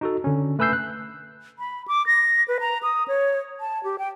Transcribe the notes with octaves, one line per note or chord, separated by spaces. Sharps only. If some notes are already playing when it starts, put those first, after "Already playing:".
D#4 F#4 A4
D3 C#4
A3 B4 G#5 E6 G6 C7
F#6
B5
D6
A#6
B4
A#5
D#6
C#5
A5
G4
G5